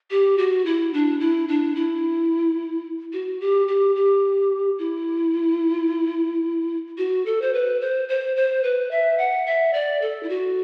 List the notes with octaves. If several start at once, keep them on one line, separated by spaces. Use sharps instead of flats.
G4
F#4
E4
D4
E4
D4
E4
F#4
G4
G4
G4
E4
F#4
A4
C5
B4
C5
C5
C5
B4
E5
F#5
E5
D5
A4
E4
F#4